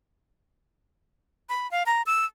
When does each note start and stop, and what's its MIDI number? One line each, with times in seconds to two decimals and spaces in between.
1.49 1.69 83
1.71 1.83 77
1.86 2.02 82
2.06 2.25 88